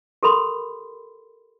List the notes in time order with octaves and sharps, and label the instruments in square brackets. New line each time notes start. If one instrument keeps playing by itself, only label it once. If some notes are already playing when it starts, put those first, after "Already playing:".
[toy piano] G4 A4 A#4 B5 C6